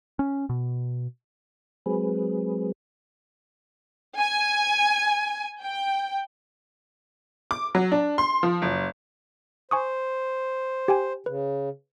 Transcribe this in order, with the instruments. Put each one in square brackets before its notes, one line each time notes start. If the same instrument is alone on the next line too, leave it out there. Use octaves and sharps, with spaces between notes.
[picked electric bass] C#4
B2
[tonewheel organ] F#3 G#3 C4 G#4 B4
[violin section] G#5
G5
[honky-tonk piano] D6
F#3
D4
C6
F3
F#1
[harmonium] C5 [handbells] G#5 C#6 D#6
[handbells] G4 G5 G#5
[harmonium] C#3 [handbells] B4